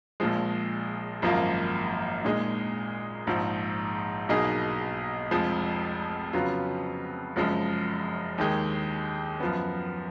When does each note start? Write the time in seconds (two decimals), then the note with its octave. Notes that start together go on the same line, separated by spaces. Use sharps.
0.20 A#1 A#2 F3 G#3
1.22 G#1 F#2 F3 A#3 F4
2.25 A#2 G#3 D#4 G#4
3.27 A#1 G#2 F3
4.29 B1 B2 A#3 D#4 G#4
5.31 F1 F2 F3 G#3
6.33 F2 C#3 F#3 B3 F4
7.36 F#1 F#2 F3 G#3
8.38 D#2 D#3 G#3
9.40 F#2 F3 B3